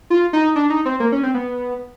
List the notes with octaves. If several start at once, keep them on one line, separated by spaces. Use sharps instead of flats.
F4
D#4
D4
D#4
C4
A#3
C#4
C4
B3